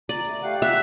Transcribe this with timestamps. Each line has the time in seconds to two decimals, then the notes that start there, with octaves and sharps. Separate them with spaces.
0.09 D5 A#5
0.27 A3
0.43 A3 G4 F5 F#5
0.62 E5 F#6